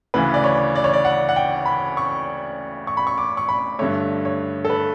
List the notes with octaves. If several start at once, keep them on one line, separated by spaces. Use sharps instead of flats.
D2 C#3 E3 B4
D5
C#5
D5
C#5
D5
F#5
F#5
G5
B5
C#6
C#6
B5
C#6
D6
C#6
B5
G2 D3 A3 C#5
C#5
A4
B4